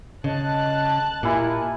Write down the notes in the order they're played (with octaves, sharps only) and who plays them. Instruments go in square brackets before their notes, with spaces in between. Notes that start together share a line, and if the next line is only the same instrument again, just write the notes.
[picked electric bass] C#3 [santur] D#5 [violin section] A5 F#6
[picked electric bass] A#2 [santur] E4 G4 [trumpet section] A#4 G#5